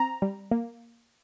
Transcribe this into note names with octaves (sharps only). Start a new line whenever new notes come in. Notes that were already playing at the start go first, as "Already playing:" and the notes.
Already playing: C4 A#5
G3
A#3